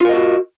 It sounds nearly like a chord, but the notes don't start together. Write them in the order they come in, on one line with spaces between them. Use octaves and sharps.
F4 A#4 D#5 F#4